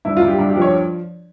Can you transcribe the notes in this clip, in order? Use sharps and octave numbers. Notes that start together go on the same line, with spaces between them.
G2 E4
F4
G2
G4
G2
G4
F3
C#5